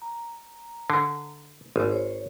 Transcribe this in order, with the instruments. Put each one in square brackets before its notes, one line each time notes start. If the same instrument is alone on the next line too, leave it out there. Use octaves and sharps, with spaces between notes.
[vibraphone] A#5
[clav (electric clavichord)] D3
G#1
[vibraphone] C5 C#5